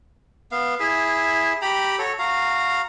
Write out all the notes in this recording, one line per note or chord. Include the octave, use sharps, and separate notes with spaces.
B3 F5
E4 G#4 E5
G4 G5 A#5 B5
F#4 A4 C#5
F#4 F5 A#5